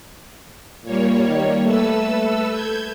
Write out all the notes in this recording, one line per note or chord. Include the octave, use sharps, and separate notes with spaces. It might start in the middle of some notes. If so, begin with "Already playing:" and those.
A#2 G3 A#3 C#5
D#3
A3 A4 B4 E6
G6 G#6